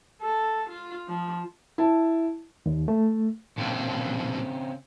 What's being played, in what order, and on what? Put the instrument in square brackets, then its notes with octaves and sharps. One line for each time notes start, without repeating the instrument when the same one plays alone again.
[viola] A4
F4
F3
[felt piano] E4 A5
[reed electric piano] D#2
A3
[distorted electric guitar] B1 A#2 [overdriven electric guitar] C#3 C4